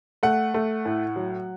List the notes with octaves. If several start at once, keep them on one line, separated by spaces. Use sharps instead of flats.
A3 F#5
A3
A2
F#3